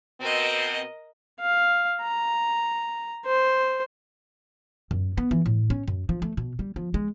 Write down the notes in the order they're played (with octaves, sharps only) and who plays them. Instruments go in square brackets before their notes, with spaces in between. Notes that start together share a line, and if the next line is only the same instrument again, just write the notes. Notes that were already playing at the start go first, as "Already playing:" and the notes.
[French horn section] B2 C4 [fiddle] A#4 D#5
[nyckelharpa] F5
A#5
C5
[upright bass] F#2
B3
E3
A2
C#4
F#2
F3
A3
B2
G3
F3
G#3